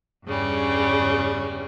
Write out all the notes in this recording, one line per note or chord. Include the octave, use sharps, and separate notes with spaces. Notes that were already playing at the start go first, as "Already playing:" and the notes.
E2 G2 C#3 G3 C#4